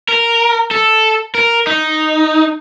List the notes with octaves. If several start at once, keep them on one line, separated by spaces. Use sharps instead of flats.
A#4
A4
A#4
D#4